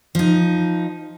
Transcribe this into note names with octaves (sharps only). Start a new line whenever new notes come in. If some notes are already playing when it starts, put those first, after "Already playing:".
F3 D#4